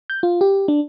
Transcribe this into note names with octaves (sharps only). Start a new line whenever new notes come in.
G6
F4
G4
D4